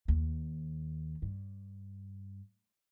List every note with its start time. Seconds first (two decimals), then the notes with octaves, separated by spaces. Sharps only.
0.08 D#2
1.22 G2